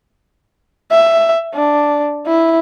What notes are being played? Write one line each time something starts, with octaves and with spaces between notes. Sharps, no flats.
E5
D4
E4